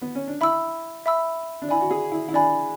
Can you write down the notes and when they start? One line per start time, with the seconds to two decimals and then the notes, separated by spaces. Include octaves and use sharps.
0.02 B3
0.15 C#4
0.28 D4
0.41 E4 E5 B5 E6
1.06 E5 B5 E6
1.62 D4
1.69 E4 D5 G#5 B5
1.81 F#4
1.90 G#4
2.12 E4
2.29 E4
2.33 D4 D5 G#5 B5